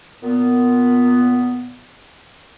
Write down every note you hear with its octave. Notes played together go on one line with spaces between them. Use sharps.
A#2 B3